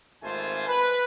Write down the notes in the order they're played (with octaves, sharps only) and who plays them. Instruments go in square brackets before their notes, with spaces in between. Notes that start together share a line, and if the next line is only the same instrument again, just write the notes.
[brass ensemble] G#1 A3 F4 C5 G#5
B4